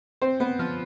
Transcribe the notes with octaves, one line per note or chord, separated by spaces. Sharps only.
C4 C5
B3 B4
F3 F4